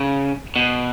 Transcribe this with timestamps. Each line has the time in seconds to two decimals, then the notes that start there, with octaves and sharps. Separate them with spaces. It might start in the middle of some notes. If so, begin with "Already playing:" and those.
Already playing: C#3
0.56 B2